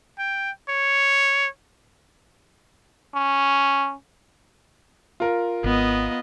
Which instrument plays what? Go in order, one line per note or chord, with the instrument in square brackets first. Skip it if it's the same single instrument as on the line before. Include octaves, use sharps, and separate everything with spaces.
[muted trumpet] G5
C#5
[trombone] C#4
[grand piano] F4 A#4
[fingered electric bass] G#1 [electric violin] B3 D#5